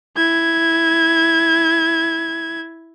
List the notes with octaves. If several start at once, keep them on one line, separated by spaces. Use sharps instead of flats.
E4 G#6